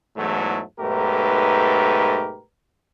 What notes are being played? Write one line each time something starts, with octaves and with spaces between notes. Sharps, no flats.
E2 G#2 E3 F#3 A3
B1 G#2 A3 G4 A#4 B4